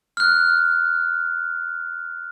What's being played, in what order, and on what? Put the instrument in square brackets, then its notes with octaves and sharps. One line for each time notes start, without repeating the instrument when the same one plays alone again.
[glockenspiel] F6 F#6